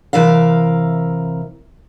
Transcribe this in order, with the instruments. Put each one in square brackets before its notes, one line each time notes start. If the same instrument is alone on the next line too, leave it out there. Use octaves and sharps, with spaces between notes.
[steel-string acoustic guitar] C3 E3 A#4 E5 F5